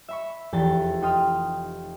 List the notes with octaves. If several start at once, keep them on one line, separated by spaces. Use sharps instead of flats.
E5 B5 C#6
F1 E2 G4 A5 G6 A6
D#4 G5 C6 D#6 F6